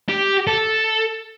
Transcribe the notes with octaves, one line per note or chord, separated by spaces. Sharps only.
G4
A4